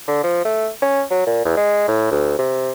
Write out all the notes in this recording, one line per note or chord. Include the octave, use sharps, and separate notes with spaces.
D3
F3
A3
C#4
F#3
A#2
E2
G#3
A2
D2
C3